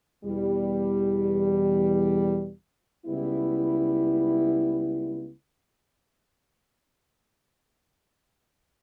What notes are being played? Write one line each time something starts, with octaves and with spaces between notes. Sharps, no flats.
E2 B2 G3
C#2 C#3 G3 B3 E4